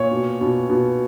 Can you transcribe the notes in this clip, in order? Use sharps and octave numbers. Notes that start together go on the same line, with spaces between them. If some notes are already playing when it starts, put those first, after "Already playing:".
Already playing: A#2 C#5
B2
B2
B2